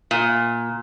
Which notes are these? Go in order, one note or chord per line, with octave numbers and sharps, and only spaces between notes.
A#2